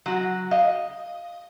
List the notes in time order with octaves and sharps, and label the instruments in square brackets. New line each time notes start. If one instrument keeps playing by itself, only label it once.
[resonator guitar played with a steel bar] F#3 F#4
[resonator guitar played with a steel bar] D#5 [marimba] F5